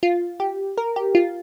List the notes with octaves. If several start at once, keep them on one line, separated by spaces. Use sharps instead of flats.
F4
G4
A#4
G4
F4